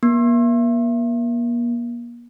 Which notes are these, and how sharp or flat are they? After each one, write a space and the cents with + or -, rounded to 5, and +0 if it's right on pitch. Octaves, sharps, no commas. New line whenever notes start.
A#3 +40